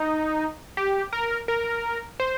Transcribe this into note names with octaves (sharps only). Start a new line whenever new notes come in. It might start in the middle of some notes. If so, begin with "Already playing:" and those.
Already playing: D#4
G4
A#4
A#4
C5